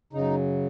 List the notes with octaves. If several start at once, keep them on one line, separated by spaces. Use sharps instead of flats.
F#2 C#3 D#4